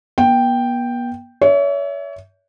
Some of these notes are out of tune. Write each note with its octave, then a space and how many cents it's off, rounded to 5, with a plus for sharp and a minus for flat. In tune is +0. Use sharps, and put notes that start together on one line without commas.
B3 -40 G5 +0
C#5 +35 E5 +0